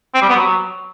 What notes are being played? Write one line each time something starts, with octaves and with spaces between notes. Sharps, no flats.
C4
G3
B3
F#3